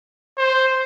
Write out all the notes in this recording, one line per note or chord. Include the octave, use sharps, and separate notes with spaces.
C5